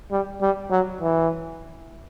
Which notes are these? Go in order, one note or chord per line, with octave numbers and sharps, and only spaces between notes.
G3
G3
F#3
E3